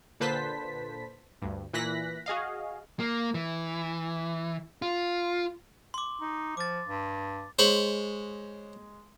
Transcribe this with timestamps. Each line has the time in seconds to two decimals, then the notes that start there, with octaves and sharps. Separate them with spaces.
0.20 A#2 D3 B4 C5 A5 B6
1.42 D2 G2
1.73 A#2 E3 F#6 A#6 B6
2.26 F#4 G#4 D#5 F5
3.00 A#3
3.34 E3
4.82 F4
5.94 C6 D6
6.21 D#4
6.57 F3 D6 A6
6.88 G2
7.59 G#3 C5 C#5 B5